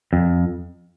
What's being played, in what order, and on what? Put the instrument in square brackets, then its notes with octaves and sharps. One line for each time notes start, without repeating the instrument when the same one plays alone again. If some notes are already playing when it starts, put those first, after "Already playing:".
[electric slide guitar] F2